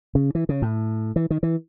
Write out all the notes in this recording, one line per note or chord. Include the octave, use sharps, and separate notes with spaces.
C#3
E3
C#3
A2
E3
D#3
E3